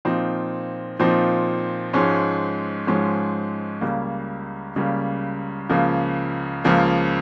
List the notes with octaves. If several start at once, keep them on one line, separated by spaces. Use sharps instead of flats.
A#2 F3 C4 D#4
A#2 F3 C4 D#4
G#2 F3 G#3 C#4
G#2 F3 G#3 C#4
C#2 C#3 G3 A#3
C#2 C#3 G3 A#3
C#2 C#3 F3 A#3
C#2 C#3 F3 A#3